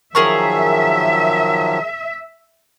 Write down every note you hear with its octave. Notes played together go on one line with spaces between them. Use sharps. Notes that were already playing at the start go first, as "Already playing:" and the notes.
D#3 F3 F#3 G#4 A#4 E5 C#6